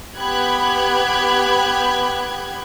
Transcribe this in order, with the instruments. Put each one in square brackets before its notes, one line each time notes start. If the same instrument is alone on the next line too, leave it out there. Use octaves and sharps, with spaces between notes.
[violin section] B3 G4 G5 B5 F#6 G#6